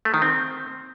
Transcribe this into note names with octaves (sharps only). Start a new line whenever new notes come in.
A3
D#3
C4